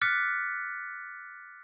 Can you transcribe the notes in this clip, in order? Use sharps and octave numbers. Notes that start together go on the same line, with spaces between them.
D6 F6 F#6 A6 B6 C#7